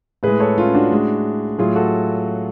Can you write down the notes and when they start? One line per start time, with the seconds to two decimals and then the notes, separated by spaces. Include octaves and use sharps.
0.23 A2 G#3 G#4 B4
0.40 A4 C#5
0.58 C#4 F4
0.75 D4 F#4
0.91 A2 G#3
1.59 A2 F#3 F4 G#4
1.76 F#4 A4